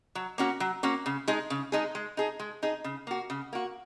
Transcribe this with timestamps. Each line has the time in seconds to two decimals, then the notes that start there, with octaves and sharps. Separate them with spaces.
0.15 F#3
0.38 A#3 C#4 F#4
0.60 F#3
0.83 A#3 C#4 F#4
1.06 C#3
1.28 G#3 D#4 G#4
1.50 C#3
1.72 G#3 D#4 G#4
1.95 G#3
2.17 D#4 G#4
2.40 G#3
2.63 D#4 G#4
2.84 C#3
3.07 A#3 F#4
3.30 C#3
3.53 A#3 F#4